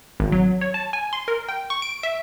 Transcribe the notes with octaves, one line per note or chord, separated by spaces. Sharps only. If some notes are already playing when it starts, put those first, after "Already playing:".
G#1
F#3
C#5
A5
G#5
C6
A#4
G5
C#6
D7
E5